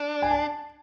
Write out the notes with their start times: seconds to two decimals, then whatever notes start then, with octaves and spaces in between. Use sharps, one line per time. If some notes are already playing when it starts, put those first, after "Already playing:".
Already playing: D4
0.22 G#5
0.31 A5